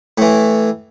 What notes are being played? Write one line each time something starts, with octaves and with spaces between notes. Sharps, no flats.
A2 E3